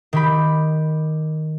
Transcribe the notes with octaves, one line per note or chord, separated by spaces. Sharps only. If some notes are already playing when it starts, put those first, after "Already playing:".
D#3 G4 B5